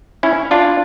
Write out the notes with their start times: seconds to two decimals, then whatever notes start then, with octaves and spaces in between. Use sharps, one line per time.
0.23 C#4 E4
0.51 D4 F4